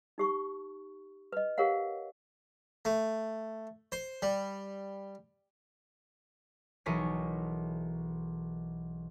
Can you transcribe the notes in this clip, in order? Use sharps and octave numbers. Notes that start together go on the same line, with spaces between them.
D#4 G4 C#6
B4 D#5
G4 A#4 C#5 F5 F#5
A3
C5
G3
B1 E3 G#4 A#4 C#5 B6